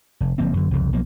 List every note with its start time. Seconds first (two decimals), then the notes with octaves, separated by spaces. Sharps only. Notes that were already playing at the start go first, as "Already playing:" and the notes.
0.20 F1
0.38 F#1 F3 A#3 C4
0.53 F#2 D3
0.71 C2 F2 C#3
0.92 B1 B2 F3 A#3